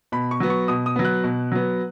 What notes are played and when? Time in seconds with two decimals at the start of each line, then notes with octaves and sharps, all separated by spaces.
0.12 B2 B5
0.31 C#6
0.40 F#3 B3
0.50 C#6
0.68 B2 D#6
0.86 D#6
0.96 F#3 B3
1.05 F#6
1.24 B2
1.52 F#3 B3